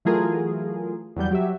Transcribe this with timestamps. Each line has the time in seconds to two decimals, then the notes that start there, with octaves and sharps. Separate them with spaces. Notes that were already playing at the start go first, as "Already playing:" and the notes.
0.05 E3 F#3 A3 F4 G#4 A#4
1.16 E2 F#3 G3 G6
1.31 F#3 G4 E5